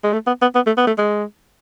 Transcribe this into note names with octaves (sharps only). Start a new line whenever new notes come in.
G#3
A3
B3
B3
B3
A3
B3
A3
G#3